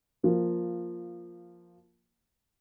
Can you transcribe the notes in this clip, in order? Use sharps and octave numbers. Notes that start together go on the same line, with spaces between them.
F3 A#3